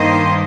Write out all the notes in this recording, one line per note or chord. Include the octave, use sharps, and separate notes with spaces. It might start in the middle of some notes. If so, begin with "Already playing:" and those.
Already playing: G2 D#3 A#3 C5 D#5